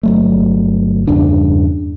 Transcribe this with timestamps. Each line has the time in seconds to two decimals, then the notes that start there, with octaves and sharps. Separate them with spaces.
0.03 G1 F#3 A3
1.07 E2 G2 C#3 D4